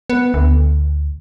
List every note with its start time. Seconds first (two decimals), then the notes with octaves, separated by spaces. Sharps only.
0.10 B3
0.34 D2